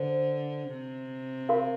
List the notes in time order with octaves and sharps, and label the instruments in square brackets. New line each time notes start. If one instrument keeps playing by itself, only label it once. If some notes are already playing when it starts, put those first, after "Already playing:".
Already playing: [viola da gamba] D3 [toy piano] C5
[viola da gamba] C3
[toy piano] A#4 F5 C6